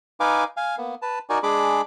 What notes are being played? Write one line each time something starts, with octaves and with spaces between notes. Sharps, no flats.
D#4 B4 F5 G#5 D6
F5 G#5
A#3 B3
B4 A5
D#4 F#4 A#4 D5 G#5
G#3 D4 G#4 B5 D6